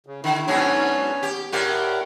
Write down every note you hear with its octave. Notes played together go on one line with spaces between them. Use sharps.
C#3
D3 E4
G#2 F#3 B3 C#4 D4 C#5
G4
A2 G4 A#4 D5 F#5